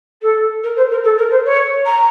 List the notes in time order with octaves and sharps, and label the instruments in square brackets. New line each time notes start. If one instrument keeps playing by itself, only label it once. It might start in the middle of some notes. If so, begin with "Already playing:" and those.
[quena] A4
A#4
C5
A#4
A4
A#4
C5
C#5
A#5